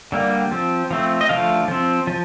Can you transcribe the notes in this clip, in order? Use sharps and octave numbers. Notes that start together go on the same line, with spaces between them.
D3 G3 A#3
F3 C4
F3 A3 C4
D#5
D3 F3 A3 F5
F3 C4
F3